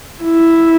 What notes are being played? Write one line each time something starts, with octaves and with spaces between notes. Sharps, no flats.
E4